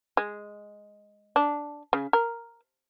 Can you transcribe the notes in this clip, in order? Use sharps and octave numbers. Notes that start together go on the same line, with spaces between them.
G#3
D4
C#3
A#4